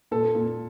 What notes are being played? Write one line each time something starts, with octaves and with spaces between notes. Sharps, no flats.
A#2 A4
A#2